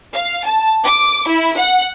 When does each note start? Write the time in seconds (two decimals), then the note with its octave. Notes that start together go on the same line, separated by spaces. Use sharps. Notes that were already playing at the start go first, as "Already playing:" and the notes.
0.13 F5
0.45 A5
0.83 D6
1.26 E4
1.57 F#5